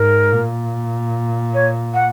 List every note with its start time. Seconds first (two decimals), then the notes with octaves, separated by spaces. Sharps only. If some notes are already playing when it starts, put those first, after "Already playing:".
Already playing: G#2 A#4
0.31 A#2
1.53 C#5
1.93 F#5